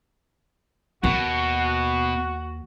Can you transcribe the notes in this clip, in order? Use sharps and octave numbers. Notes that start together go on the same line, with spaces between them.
D#2 B2 F#4